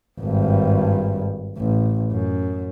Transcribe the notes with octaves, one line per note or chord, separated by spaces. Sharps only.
G#1 G2
A1
F#2